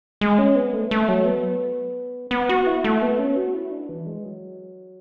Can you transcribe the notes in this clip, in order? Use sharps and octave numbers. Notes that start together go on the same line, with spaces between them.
G#3
C#4
B3
A3
A3
F#3
B3
B3
F#4
E4
A3
B3
C#4
F#4
E4
D4
E3
G#3
F#3